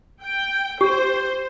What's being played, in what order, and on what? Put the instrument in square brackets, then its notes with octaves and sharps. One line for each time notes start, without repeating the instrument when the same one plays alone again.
[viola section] G5
[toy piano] G4 [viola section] C5